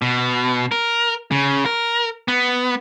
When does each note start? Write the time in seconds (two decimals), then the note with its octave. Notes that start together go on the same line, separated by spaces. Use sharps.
0.02 B2
0.72 A#4
1.31 C#3
1.66 A#4
2.28 B3